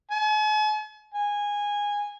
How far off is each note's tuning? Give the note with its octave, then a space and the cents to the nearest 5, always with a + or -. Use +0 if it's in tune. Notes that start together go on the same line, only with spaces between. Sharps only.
G#5 +45
G#5 -15